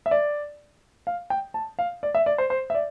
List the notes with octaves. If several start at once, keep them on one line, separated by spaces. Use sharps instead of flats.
E5
D5
F5
G5
A5
F5
D5
E5
D5
C5
C5
E5
D5